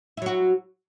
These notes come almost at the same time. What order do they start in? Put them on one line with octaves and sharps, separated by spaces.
E4 F#3 F#4